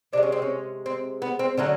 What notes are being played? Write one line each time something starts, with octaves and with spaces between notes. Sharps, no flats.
C3 F3 G#3 D4
C#4
C4
C#4
C4
B3
C4
D3 F#3 A3 C#4